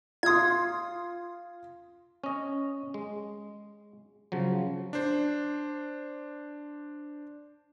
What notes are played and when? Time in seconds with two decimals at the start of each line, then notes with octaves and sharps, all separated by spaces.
0.23 F4 C6 D#6 G#6
2.24 C#4 D#5
2.94 G#3
4.32 C#3 F3 F#3
4.93 D4 C5